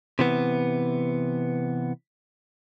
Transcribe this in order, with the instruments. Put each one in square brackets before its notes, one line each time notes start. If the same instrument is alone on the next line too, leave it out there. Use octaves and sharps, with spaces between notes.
[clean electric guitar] C3 E3 B3